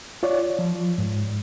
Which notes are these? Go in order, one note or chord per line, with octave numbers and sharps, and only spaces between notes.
F4 C#5 D5
F3
G#2